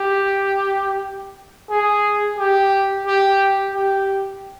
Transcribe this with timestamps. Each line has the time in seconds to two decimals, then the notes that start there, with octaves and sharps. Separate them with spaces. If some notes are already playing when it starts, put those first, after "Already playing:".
Already playing: G4
1.70 G#4
2.38 G4
3.07 G4
3.74 G4